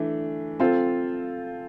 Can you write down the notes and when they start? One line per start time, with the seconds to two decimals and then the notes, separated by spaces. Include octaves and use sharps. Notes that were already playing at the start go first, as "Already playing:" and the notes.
Already playing: E3 A3 D4
0.60 C4 F4 A4